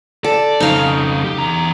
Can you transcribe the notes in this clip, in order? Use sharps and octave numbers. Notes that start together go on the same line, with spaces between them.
A4 D5
F2 C#3 D#4 F5
G4
E2 A#5